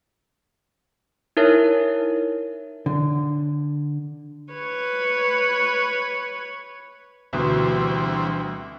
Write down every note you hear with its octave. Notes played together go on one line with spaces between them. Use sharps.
D#4 E4 A#4 C#5 E5
D3
B4 C#5
D2 B2 E3 G3 C4 C6